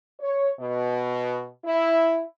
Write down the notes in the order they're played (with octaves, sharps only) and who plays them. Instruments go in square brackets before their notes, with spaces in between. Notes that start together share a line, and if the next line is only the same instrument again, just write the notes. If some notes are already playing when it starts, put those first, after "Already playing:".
[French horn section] C#5
B2
E4